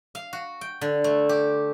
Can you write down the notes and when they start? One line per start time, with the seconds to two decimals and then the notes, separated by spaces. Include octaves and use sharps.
0.15 F5
0.33 F#4
0.61 G5
0.81 D3
1.04 A3
1.29 G4